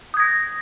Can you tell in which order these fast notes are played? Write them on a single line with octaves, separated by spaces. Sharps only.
D#6 G#6 A#6